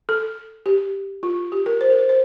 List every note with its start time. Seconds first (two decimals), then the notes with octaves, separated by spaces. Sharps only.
0.09 A4
0.66 G4
1.23 F4
1.52 G4
1.66 A#4
1.81 C5
1.90 A#4
1.99 C5
2.09 C5